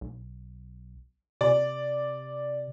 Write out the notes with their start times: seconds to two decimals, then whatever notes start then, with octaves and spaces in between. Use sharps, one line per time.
0.01 B1
1.41 C3 D5